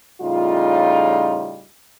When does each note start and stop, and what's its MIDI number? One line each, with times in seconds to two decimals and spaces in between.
0.22 1.66 45
0.22 1.66 49
0.22 1.66 55
0.22 1.66 63
0.22 1.66 65